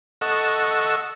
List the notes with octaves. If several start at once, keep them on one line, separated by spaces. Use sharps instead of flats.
A4 D#5 F#5 C#6 E6